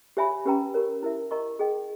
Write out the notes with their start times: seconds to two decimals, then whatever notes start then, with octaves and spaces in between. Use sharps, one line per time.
0.17 G4 C#5 E5 G#5 B5
0.45 C#4 G4 B4 G5 A#5
0.74 G4 A#4 C#5
1.03 E4 A#4 E5
1.31 A#4 D#5 A#5 C#6
1.59 G#4 D#5 G5